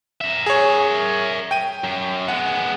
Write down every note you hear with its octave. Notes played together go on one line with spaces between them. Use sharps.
A#4 E5
G#4 C#5
G5 D#7
F#2
G#3 B3 F#5